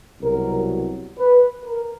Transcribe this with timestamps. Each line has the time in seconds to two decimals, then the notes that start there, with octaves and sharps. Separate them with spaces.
0.20 C2 B2 F#3 A#4
1.18 B4
1.66 A#4